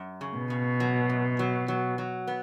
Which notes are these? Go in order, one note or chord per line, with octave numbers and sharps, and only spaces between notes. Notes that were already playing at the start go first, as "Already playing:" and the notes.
Already playing: F#2
C#3
B2
C#3
F#3
F#2
F#3
F#3
F#3
B3